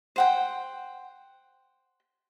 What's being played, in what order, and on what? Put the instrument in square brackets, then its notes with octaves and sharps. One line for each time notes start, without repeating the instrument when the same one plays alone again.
[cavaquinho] C5 F#5 G5